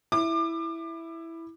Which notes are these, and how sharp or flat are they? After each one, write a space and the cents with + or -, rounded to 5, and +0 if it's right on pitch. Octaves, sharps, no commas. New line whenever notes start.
E4 +0 D6 +30